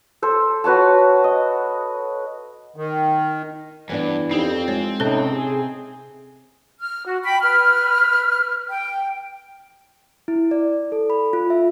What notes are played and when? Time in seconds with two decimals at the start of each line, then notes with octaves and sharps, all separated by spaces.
0.22 A4 C5
0.64 F#4 B4 C#5 A5
1.24 D#5
2.76 D#3
3.90 G2 E3 B3 D4
4.31 F2 C4 D#4 G4
4.68 G#3 C#5
5.00 A2 C3 C#4 D#4 A4 A5
5.32 G#4
6.80 F6
7.05 F#4
7.24 G5 B5
7.40 B4 F6
8.70 G5
10.28 E4
10.51 D5
10.92 A4
11.10 B5
11.33 F4
11.50 E5